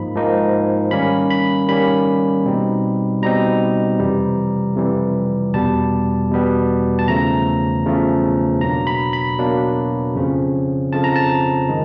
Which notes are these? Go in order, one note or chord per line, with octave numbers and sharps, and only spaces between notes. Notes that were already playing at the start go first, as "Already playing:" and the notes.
Already playing: G#2 F3 A#3 D#4 B5
G#2 F3 A#3 D#4
D#3 G3 A#3 C#4 B5
B5
D#3 G3 A#3 C#4 B5
B2 G3 C4 D#4
B2 G3 C4 D#4 A#5
F2 C3 E3 G3
F2 C3 E3 G3
E2 B2 G3 B3 A5
E2 B2 G3 B3
A5
E2 C#3 F3 A3 A#5
E2 C#3 F3 A3
B2 F#3 A#3 D4 A#5
B5
B5
B2 F#3 A#3 D4
F2 C#3 F3
F2 C#3 F3 A5
A#5
A5
D#3 G#3